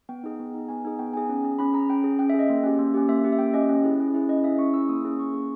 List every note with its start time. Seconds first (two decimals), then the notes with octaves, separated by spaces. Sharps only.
0.09 B3 G5
0.24 D#4 G#4
0.40 B3
0.54 D#4 G#4
0.68 B3 G#5
0.84 D#4 G#4
0.99 B3 G5
1.13 D#4 G#4 G#5
1.29 C#4
1.45 G#4
1.59 C#4 B5
1.74 G#4 A#5
1.89 C#4 G5
2.04 G#4
2.19 C#4 G5
2.30 E5
2.34 G#4 D#5
2.50 A#3
2.64 C#4 G4
2.79 A#3
2.94 C#4 G4
3.09 A#3 E5
3.24 C#4 G4
3.33 E5
3.39 A#3 G5
3.54 C#4 G4 D#5
3.69 C#4
3.84 E4 G#4
4.00 C#4
4.14 E4 G#4
4.29 C#4 D#5
4.44 G#4 E5
4.47 E4
4.59 C#4 C#6
4.74 E4 G#4 E6
4.89 A#3 D#6
5.05 C#4 G#4
5.19 A#3 C#6
5.34 C#4 G#4